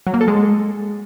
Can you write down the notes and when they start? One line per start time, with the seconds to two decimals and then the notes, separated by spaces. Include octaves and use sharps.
0.07 F#3
0.14 A#3
0.21 A4
0.28 G#3